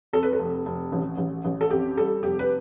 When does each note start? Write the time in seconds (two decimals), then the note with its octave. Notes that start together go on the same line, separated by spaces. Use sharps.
0.13 F2 A4
0.23 B4
0.33 A4
0.39 F1
0.66 F1
0.92 A1
1.18 A1
1.45 A1
1.61 A4
1.70 F2 G4
1.97 G3 A4
2.23 F1 G4
2.39 B4